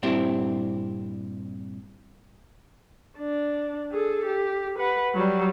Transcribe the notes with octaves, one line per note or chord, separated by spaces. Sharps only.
G2 A#2 C4 E4 G4
D4
G#4 A4
G4
B4 F#5
F#3 G3